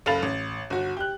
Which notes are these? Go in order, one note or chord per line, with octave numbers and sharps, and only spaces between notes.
F#1 A4 F5 B5 A6 F7
A1
G1 F#4
G4 F#6